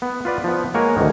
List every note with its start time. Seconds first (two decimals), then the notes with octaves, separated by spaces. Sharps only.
0.02 B3
0.25 F4 B4 D5
0.44 F3 B3
0.74 G#3 A#3 A#4 C#5 F#5 G#5
0.96 D2 G#2 D#3